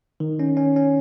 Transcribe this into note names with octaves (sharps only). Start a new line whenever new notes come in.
D#3
C#4
C#4
C#4